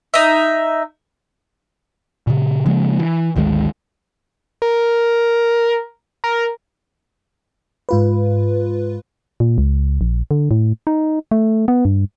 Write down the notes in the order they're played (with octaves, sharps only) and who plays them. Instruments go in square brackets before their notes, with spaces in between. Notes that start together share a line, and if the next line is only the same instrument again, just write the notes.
[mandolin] D#4 E5
[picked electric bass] A#2 C#3
C#3 F3 G#3 A#3
E3
G#1 D2 D#3 G#3
[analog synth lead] A#4
A#4
[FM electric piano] G#2 F4 B4
[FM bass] A#2
C#2
A#1
D3
A2
D#4
A3
B3
G2